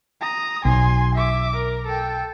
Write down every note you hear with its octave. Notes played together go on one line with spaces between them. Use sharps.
A#5 D#6
B1 G#5 C6
E5 D6
A#4
A4 G5